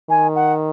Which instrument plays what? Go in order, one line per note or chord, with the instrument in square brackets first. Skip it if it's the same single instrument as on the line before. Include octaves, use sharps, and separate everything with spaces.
[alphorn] D#3 [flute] G#5
[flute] F#5